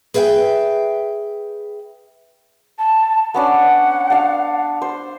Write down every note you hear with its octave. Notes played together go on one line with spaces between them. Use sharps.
G#4 B4 E5 F5 G5
A5
B3 C#4 D4 F#5
D4 F5
C5